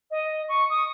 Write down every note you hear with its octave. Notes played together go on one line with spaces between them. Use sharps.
D#5
C#6
D#6